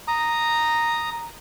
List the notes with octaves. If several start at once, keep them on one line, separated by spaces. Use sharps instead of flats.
A#5 D#6